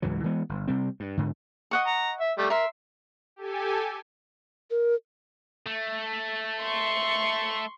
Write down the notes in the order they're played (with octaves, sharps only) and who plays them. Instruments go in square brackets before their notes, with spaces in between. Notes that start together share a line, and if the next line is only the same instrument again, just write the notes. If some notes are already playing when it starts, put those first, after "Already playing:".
[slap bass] C#2 G#2 E3 F#3
E3 G#3 B3
G1
C3 G3 C4
G2
G#2 D3
[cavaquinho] D#5 F#5 C#6
[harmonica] A#5
E5
G3 A3
[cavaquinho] A#4 C6 [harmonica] E5
[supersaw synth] G4 A4 G#5
[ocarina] A#4
[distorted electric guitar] A3
[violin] C6 C#6